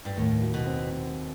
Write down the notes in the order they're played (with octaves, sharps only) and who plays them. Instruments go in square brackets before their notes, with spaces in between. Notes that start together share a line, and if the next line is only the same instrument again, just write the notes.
[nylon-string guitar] G2
[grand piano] D#2 [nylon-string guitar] A2
[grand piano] F#3
[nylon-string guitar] B2
[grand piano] C4